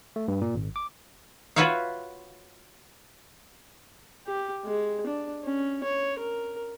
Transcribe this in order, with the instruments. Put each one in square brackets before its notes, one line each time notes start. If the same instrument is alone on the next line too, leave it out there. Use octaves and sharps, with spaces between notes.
[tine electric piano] A3
G2
A#2
G#1
D6
[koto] F4 F#4 B4 C#5 E5 F5
[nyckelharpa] G4
G#3
D4
C#4
C#5
A#4